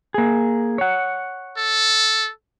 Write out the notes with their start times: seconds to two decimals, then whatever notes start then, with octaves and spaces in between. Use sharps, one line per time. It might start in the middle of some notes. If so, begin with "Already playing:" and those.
0.14 A#3 G#4
0.78 C#5 F#5
1.57 A4